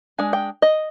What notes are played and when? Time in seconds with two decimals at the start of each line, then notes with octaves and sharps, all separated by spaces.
0.18 G#3 D4 G#5
0.33 G5
0.62 D#5